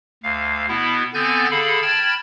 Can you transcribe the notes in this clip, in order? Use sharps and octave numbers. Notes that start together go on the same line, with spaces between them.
D2 F5
B2 B3 E4
D3 B3 C4 G#5 G6 A6
D3 G#4 A4 F5 B5
G5 A5 B5 F6 G#6 A6